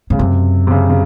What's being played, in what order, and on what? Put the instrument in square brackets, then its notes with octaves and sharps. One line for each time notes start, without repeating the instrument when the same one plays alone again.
[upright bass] G#2 [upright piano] C#3
[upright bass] F#2 [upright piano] C3
[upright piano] C3
C#3
C#3